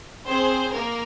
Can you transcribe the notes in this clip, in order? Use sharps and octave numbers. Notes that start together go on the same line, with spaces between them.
C4 G#4 C5
A#3 A#4